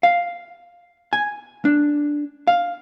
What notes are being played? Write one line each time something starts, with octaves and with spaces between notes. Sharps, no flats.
F5
G#5
D4
F5